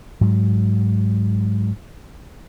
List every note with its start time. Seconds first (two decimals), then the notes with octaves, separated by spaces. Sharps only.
0.21 G#2 F#3